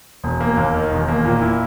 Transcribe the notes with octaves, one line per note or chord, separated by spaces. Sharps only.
E1
A#3
D#2
D#3
E1
A#3
A#2
E4